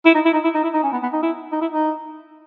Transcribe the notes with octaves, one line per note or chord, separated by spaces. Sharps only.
E4
D#4
E4
D#4
E4
D#4
E4
D#4
C#4
B3
B3
D#4
E4
D#4
E4
D#4